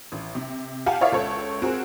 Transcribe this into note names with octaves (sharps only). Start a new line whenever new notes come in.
A1
C3
G4 F5 F#5 G#5 A5
E4 A#4 C#5 D5 E5 F5
C#2 A4 C#5
C4 F#4 G#4 A#4